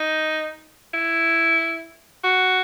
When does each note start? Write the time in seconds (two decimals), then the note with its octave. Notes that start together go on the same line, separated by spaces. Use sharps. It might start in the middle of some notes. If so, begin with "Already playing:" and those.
Already playing: D#4
0.93 E4
2.24 F#4